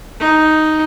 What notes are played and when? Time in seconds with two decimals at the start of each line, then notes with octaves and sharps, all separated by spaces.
0.20 D#4